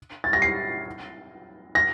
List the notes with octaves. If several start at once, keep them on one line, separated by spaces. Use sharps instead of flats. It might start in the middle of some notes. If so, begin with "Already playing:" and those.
A6
A#6
C7
A#6